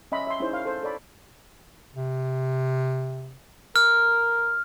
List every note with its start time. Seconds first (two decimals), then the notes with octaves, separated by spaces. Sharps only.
0.12 C#4 D#5 E5 B5 C6
0.27 E5 C6
0.40 C#4 D#4 E4 G#4 C5
0.53 F5
0.66 A4 C5
0.83 A4 C#5 D5 B5
1.95 C3
3.76 A#4 F6